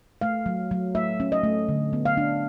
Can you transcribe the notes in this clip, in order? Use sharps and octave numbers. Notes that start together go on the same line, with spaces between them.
A3 F5
F#3
F#3
A3 E5
C#4
D#5
A3
D3
B3
F5
D4